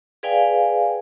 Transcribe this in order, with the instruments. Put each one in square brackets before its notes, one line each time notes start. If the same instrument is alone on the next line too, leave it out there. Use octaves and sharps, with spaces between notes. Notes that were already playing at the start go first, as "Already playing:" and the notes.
[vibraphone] G#4 B4 D5 F5 G5 G#5